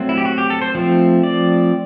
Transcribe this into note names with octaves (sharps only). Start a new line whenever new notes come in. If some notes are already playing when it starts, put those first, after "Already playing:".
Already playing: F#3 A3 C4
E4
G4
F#4
G4
A4
C5
F3 A3 C4
D5